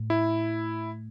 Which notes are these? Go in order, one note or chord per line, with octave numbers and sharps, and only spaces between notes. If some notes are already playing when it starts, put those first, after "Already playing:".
Already playing: A2
E4